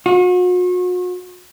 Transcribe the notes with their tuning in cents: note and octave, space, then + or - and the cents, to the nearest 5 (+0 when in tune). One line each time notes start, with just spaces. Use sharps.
F#4 -40